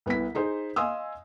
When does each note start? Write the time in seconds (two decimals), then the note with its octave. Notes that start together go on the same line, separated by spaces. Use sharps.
0.06 C2 B3 E4 B6
0.35 D#4 G#4 C5
0.76 D#5 F5 G#5 C6 D#6 E6